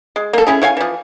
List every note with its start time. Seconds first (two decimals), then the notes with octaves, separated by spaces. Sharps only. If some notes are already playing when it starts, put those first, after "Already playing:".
0.16 G#3
0.33 A#3 A4
0.47 C#4 E4 G#4
0.62 E4 C#5 F5 G#5
0.77 E3 F3